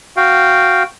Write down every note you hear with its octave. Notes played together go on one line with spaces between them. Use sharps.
F#4 F5 G5